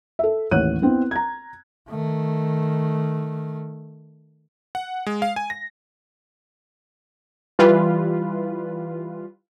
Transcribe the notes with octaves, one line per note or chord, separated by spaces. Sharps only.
A4 E5
A1 D#2 C#5 F#5 F#6 D#7
B3 C4 E4
A#5 G#6
D#3 A3
F#5
G#3
F5
G#5
A#6
E3 G3 F4 B4